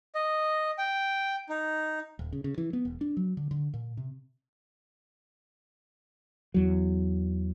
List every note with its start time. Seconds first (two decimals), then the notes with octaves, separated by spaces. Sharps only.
0.15 D#5
0.78 G5
1.49 D#4
2.19 D#1
2.32 C#3
2.44 C#3
2.58 E3
2.73 B3
2.85 E1
3.01 D4
3.17 F#3
3.37 D3
3.51 D3
3.74 A#2
3.97 C3
6.54 E2 F#3